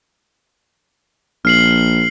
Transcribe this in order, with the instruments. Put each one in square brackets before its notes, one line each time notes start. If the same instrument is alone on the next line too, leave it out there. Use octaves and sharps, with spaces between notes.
[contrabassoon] A#1 [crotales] F6 C7 F#7